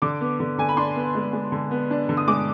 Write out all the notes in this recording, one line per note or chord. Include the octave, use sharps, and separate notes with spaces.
D3 D6
B3
D3
D3 G#5
B5
D4 C6
B3
G#3
G#3
D3
B3
D4
D3
D#6
G#3 D6